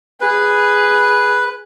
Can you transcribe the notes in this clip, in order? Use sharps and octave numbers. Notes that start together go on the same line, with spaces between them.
G#4 B4